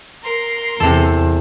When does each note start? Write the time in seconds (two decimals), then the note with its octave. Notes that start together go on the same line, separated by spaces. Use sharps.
0.23 A#4 C6
0.80 E2 C3 A4